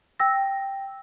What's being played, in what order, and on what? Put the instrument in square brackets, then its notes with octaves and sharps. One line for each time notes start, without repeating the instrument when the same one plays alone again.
[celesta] G5 E6 A#6